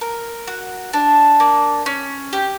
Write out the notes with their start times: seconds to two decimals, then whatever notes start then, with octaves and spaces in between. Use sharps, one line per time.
0.01 A#4
0.47 F#4
0.93 D4
1.40 A#3
1.86 C#4
2.33 G4